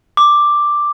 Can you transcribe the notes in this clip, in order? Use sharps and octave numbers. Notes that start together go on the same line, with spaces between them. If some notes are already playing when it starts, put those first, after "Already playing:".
D6